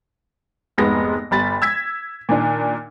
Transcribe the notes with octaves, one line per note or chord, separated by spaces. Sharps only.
F1 G#2 G#3 B3 A#6
G1 G3 B5 A6
E6 G#6 B6
A#2 D#3 D4